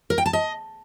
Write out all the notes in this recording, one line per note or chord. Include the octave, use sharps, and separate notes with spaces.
A#4
G5
A5
D#5